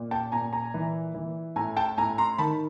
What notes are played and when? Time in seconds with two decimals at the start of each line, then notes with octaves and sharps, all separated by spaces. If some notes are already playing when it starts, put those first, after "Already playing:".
Already playing: A#2
0.11 G5 A5
0.32 A#2 G#5 A#5
0.53 G#5 A#5
0.74 E3
1.15 E3
1.56 A2 G#5 A#5
1.77 G5 A5
1.98 A2 G#5 A#5
2.18 A#5 C6
2.38 D#3 A5 B5